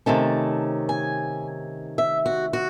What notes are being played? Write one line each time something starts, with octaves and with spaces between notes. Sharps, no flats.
C3 D#3 A3 C#4 A5
G#5
E5
F#4
F#4